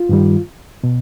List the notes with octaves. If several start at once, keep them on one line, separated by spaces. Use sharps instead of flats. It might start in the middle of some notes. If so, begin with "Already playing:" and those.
Already playing: F4
G2 D#3 G3
B2